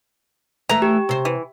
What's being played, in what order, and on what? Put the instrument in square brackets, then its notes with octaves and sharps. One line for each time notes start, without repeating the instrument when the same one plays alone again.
[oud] E3 A3 [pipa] A#5
[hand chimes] G4
[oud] C3 C5
[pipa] E3